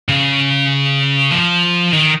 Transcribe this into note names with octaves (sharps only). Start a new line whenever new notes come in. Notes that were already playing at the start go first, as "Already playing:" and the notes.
C#3
F3
D#3